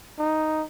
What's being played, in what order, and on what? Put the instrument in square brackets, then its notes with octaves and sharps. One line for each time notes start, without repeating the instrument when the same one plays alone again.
[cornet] D#4